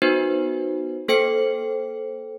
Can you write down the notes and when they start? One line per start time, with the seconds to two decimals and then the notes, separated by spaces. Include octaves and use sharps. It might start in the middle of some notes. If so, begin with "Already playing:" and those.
0.02 B3 D#4 F#4 B4 C5
1.08 A#3 A4 C5 G5 C#7